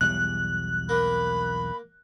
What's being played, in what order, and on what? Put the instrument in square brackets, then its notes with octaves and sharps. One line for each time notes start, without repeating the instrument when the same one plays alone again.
[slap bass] B1 E2 G3 [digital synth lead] F#6
[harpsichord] A#3 [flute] B5